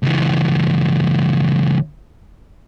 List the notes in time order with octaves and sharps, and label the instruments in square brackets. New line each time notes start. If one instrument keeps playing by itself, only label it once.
[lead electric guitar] C#2 E3